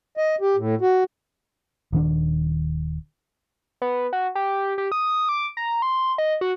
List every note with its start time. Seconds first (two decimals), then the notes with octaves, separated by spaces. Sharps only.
0.17 D#5
0.41 G4
0.56 A2
0.81 F#4
1.92 D#1 D#3 D4
3.82 B3
4.13 F#4
4.35 G4
4.78 G4
4.92 D#6
5.29 D6
5.57 A#5
5.82 C6
6.18 D#5
6.41 F#4